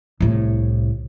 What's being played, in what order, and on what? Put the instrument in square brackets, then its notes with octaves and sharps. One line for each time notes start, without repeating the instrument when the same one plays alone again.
[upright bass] C2 A2